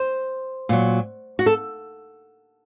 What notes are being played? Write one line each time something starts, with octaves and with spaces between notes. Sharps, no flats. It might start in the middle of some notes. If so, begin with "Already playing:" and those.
Already playing: C5
A#2 F#3
F#4
A4